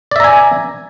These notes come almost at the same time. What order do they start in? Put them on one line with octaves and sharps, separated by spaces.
D5 E5 A#5 G#5